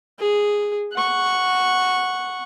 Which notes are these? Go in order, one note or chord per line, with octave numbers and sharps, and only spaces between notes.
G#4
F#5 C#6